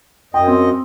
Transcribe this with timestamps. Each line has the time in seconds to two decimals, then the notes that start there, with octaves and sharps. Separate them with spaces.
0.34 F#2 D#5 G5
0.48 C4